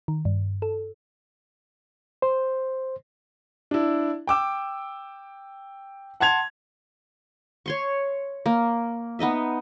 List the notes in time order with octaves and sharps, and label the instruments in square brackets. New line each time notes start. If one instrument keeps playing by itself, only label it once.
[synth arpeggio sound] D#3
G2
A4
[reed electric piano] C5
[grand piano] D4 E4
G5 D6 E6
F#5 A5 C6 G#6 F7
[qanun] C#5 C6 C#6
A#3
B3 D#4 D#5 E5